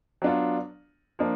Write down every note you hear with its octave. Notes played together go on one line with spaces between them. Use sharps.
F#3 B3 D4 F4
F3 A#3 D4